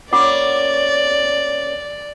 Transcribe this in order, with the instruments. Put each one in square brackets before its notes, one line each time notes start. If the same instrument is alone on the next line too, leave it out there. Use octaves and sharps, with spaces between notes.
[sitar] A#3 C#4 [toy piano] F4 F#5 D6 [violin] D5